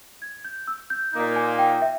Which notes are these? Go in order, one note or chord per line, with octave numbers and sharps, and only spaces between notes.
G#6
G6
E6
G6
A#2 A#3 D#4 G6
G#5
G5
E5